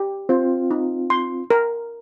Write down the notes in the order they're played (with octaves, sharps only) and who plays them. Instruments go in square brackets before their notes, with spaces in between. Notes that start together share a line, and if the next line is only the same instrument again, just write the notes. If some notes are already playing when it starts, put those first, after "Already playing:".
Already playing: [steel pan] G4
[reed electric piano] C4 F4 [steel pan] C5
[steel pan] D#4
C6
A#4